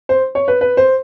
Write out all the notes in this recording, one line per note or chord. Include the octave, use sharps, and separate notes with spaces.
C5
C#5
B4
B4
C5